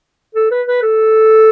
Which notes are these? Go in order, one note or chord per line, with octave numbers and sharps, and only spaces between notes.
A4
B4
B4
A4